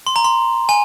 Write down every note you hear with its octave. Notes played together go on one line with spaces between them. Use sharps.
C6
A#5
C6
G#5